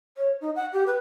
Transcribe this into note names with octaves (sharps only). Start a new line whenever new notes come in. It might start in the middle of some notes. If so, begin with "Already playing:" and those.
C#5
D#4
F#5
G4
B4